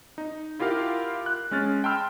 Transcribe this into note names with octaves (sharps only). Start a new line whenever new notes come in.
D#4
E4 F4 G4 A#4 F5 F#5
F#6
G#3 C#4 F6 A6
G5 A5 B5 C6 E6 F6